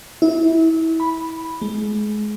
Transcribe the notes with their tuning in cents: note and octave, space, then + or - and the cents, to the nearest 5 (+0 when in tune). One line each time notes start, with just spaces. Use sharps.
E4 -25
B5 -5
G#3 +30